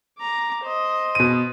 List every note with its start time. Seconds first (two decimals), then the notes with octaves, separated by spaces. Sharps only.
0.19 A#5 D6
0.64 C5 D#5
1.15 B2 D#7